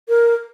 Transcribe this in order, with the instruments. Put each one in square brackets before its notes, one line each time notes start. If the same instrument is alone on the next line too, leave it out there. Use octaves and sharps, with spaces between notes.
[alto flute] A#4